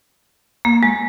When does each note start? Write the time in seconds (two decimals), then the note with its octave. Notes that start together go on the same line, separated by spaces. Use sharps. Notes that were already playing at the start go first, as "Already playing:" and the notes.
0.65 A#3
0.83 G#3